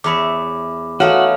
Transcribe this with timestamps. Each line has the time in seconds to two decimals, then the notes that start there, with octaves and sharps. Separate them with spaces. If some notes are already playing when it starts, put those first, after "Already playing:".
0.04 E2 C#5 E5 B5 D6
1.00 E3 A3 D#4 F#4 C#5 F5 F6